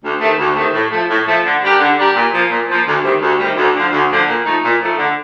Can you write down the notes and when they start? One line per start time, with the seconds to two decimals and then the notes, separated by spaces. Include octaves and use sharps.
0.04 D2
0.21 C3 D#3 A3
0.39 D2
0.56 C3 D#3 A3
0.74 A2
0.92 F3 A3
1.09 A2
1.28 F3 A3
1.45 D3
1.62 G3 D4 G4 A#4
1.80 D3
1.98 G3 D4 G4 A#4
2.16 A#2
2.33 F3 A#3
2.51 A#2
2.68 F3 A#3
2.86 D2
3.04 C3 D#3 G3
3.21 D2
3.40 C3 D#3 G3
3.57 D2
3.75 D3 F3
3.92 D2
4.11 D3 F3
4.28 A#2
4.46 F3 A3 D#4
4.63 A#2
4.81 F3 A3 D#4
4.98 D3